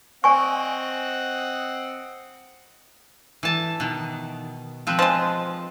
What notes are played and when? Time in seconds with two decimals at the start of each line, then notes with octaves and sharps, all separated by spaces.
0.24 C4 D5 D#5 F#5 G#5 C#6
3.43 E3 A5
3.80 B2 D#3
4.87 F3 C4 B4
4.99 F3 G#3 A5